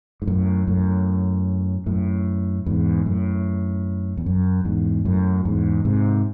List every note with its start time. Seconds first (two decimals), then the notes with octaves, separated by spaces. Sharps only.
0.22 G#2
0.27 F#2 A2
0.67 F#2 A2
1.86 F#2 A2
2.66 E2 G#2
3.06 F#2 A2
4.17 E2
4.26 F#2
4.65 E2 G#2
5.05 F#2 A2
5.45 E2 G#2
5.85 G#2 C3